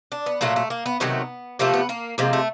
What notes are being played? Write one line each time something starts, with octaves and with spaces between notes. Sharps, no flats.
D4
B3
A#2 F#3 A3 A#3
A3
A#3
B3
C3 D#3 F#3 A3 B3
C3 F3 A3 A#3
B3
A#3
C3 F3 G#3 A#3
A3